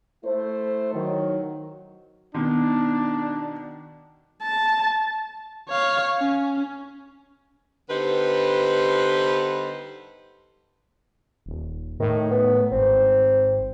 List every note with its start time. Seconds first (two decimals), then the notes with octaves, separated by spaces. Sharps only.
0.24 A3 E4 C5
0.94 D#3 F#3
2.34 B2 D#3 D4
4.43 A5
5.69 C#5 F5
6.20 C#4
7.90 D3 G3 B3 D#4 B4 C5
11.46 D#1
12.00 A2 D#3
12.31 B3
12.72 G#1 C4